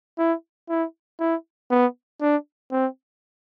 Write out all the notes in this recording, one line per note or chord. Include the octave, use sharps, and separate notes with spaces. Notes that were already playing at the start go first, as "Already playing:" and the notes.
E4
E4
E4
B3
D4
C4